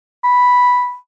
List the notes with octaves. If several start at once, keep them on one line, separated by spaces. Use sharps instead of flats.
B5